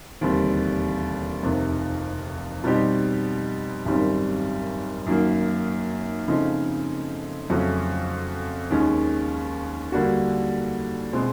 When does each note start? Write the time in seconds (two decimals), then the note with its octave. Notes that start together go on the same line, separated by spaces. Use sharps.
0.21 E1 D#2 D3 G3 C4
1.43 F1 F2 C3 D#3
2.64 B2 G3 C4 D#4 G4
3.85 G#1 F#2 D#3 G3 C4
5.06 F#2 D#3 F#3 A#3
6.28 C#3 F3 A3 C4 D#4
7.50 F2 C#3 F#3 A3 C#4
8.70 D#2 D#3 G#3 C#4
9.92 D3 G3 A#3 D4 F#4
11.13 B2 G#3 C4